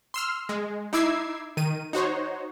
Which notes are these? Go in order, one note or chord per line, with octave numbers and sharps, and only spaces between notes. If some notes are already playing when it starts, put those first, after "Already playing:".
C6 E6 F6
G#3
D#4 E4 D6 E6 G#6 C7
D#3 D#7
D#4 F#4 C5 C#5